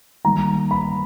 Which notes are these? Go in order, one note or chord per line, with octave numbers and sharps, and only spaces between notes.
D#3 G3 A#3 D#4 A#5
B5